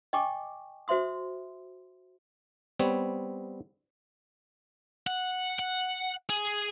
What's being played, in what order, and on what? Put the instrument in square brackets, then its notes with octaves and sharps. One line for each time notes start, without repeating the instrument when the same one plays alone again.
[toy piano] D#5 G5 G#5 C#6 D6
F#4 C5 E5 C6 D#6
[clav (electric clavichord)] G3 B3 C4 C#5
[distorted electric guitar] F#5
F#5
G#4